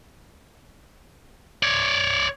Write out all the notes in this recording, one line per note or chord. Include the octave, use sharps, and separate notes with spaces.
C#5 D5